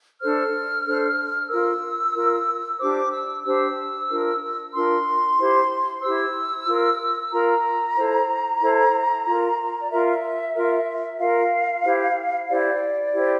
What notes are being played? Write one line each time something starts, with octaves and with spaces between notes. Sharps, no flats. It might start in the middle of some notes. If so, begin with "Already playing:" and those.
D4 A4 C5 F6
D4 A4 C5
F4 A#4 E6
F4 A#4
D4 G4 C5 D6
E6
D4 G4 C5 E6
D4 F4 A#4
D4 F4 A#4 C6
E4 G4 C5
E4 G4 C5 E6
F4 A#4
F4 A#4 A#5
E4 A4 C5
E4 A4 C5
F4 A#4
D5
F4 A#4 E5
F4 A#4
F4 A#4 F5
E4 G4 C5
E4 G4 C5 D5
E4 G4 C5